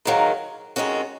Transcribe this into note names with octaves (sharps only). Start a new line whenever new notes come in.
G#2 D#3 F#3 A#3
F2 D#3 G#3 C#4 F#4